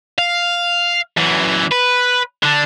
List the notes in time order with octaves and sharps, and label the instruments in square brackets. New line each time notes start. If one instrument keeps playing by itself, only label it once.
[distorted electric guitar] F5
F#2 E3
B4
D3 D4